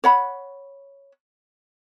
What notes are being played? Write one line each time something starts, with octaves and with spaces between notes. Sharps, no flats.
C#5 F#5 B5